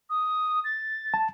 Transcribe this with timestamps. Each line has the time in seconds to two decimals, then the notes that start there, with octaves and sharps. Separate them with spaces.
0.10 D#6
0.65 A6
1.14 A5